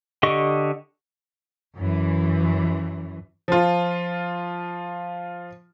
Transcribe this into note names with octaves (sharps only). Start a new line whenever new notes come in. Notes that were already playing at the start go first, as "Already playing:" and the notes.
D3 G4 D#5 C#6
F#2 E3
F3 F4